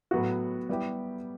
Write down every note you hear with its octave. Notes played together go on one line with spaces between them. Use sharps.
A2 F#3 B3 F#4
G3 B3 E4 G4